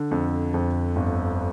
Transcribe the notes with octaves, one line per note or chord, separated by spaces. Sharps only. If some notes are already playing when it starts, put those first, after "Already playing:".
Already playing: D3
F2
F2
G1